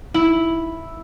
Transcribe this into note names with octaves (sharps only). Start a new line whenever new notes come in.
E4